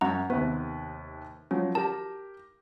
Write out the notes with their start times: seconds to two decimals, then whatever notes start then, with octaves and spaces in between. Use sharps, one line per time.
0.01 F#2 C#4 F#4 F#5 A#5
0.30 D#2 C3 B3 B4
1.51 F3 F#3 C#4
1.75 G4 A#4 A5